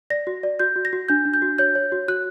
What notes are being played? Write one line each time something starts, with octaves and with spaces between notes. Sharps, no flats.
D5 A#6
F#4
D5
F#4 G6
F#4
A#6
F#4
D4 G6
D4
G6
F#4
C#5 G6
C#5
F#4
F#4 F#6